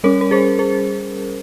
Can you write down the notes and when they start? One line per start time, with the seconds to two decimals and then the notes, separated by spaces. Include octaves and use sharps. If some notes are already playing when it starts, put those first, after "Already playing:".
0.04 G3 C#4 A#4 C#5
0.21 A#4
0.31 G#4 C5
0.59 G#4 C5